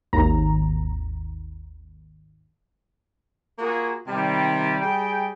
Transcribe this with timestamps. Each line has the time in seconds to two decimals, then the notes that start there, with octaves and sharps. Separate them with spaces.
0.13 G#1 D#2 A#5
3.59 A#3 F4 F#4 G#4
4.08 C3 D#3 G3
4.80 G3 G#4 G5